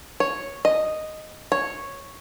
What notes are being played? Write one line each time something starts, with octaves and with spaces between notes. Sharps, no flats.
C#5
D#5
C#5